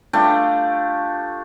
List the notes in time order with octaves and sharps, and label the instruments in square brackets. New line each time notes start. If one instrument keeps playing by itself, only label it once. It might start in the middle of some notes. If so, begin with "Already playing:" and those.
[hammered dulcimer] A3 D4 F4 G4